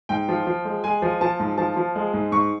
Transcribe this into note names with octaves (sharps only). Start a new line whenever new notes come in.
G#2 G5
F3
F3
G#3
G#3 G#5
F3
F3 A5
G#2
F3 A5
F3
G#3
G#2
G#2 C#6